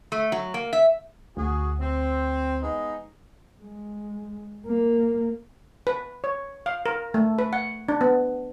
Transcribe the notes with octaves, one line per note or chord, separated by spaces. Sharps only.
A3
F#3
A#3
E5
D2 F#4 G#4
C4
G#3 B3 D#4
G#3
A#3
B4
C#5
F5
A#4
A3
B4
F#5
D4
B3